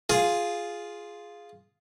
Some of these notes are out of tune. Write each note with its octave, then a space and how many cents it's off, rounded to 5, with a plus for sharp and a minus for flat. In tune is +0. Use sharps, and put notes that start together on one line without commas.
F4 +0 G#4 +0